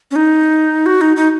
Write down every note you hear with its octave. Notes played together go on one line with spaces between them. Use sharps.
C#4
D#4
F#4
D#4
D#4